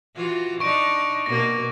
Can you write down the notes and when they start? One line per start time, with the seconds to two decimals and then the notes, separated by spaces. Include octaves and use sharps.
0.16 E3 F4 F#4
0.60 D4 D#4 C#6 D7
1.26 B2 A#3 A#6